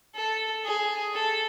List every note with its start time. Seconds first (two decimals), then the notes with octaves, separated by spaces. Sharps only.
0.16 A4
0.65 G#4
1.14 A4